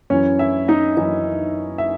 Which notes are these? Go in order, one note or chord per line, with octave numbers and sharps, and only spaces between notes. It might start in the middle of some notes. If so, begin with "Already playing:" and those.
F#2 E3 C#4 C#5
E4 E5
D#4 D#5
F#2 E3 D#4 D#5
E5